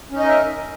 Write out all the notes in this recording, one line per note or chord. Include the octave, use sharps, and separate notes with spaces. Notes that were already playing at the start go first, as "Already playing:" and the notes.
C#4 D#4 A#4 D#5 E5